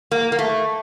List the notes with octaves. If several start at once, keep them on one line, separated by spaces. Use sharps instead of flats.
A#3
A#3
A3